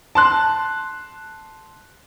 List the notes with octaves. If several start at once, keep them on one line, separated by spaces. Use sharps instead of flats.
A5 C6 F#6